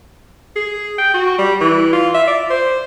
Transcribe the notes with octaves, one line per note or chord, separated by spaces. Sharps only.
G#4
G5
F#4
G3
E3
F4
E5
D5
C5